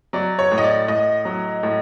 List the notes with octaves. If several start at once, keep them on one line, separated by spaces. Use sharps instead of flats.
F#3 D5
C#5
A2
D#5
D5
A2 D#5
F#3
A2